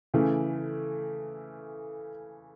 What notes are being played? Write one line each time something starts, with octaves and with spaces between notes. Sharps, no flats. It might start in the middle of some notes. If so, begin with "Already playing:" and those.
C#3 E3 A3